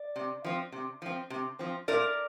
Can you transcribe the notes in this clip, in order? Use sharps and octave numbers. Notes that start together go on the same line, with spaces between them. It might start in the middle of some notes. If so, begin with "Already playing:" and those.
Already playing: D5
C3
F3 C4
C3
F3 C4
C3
F3 C4
A#2 A#4 D5